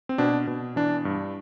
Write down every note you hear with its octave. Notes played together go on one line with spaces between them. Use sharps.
C4
B2 D4
B2
E3 D4
G2